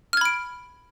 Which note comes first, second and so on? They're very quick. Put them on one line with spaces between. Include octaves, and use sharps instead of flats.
F6 G#6 B5 D7